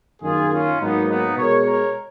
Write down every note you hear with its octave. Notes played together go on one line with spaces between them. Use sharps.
F#2 D#3 A#3 F4 G#4
C#4 F4
G#2 F#3 A#3 B3 D#4
B3 D#4
B2 G#3 A#4 C#5
A#4 C#5